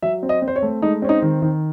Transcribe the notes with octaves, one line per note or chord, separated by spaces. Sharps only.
F#3 E5
C4
D#5
C4
C5
C#5
A3
G#3 D#4
C4 C#4
D#4
D#3
D#3